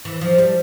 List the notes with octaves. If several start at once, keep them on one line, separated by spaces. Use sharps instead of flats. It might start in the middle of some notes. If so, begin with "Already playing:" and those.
E3
F3
G3